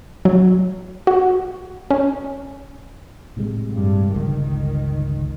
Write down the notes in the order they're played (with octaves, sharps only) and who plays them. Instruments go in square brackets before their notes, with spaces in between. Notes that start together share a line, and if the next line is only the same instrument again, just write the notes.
[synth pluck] F#3
F#4
C#4
[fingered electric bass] A2 C3 G#3
[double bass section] G2
[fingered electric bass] G1 C#2 [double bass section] D#3